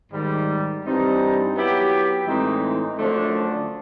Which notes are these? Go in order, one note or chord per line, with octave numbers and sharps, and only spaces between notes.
G#2 D#3 G3
G2 E3 G3 C4 D#4
F#3 B3 E4 G4
A2 E3 G#3 C4 D#4
F#2 D3 F3 A3 D4